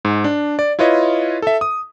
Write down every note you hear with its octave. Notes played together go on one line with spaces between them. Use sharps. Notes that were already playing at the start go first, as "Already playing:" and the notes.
G#2
D4
D5
E4 F4 B4 C#5 D#5
A4 E5
D#6